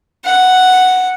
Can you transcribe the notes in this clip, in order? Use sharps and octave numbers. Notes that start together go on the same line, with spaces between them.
F#5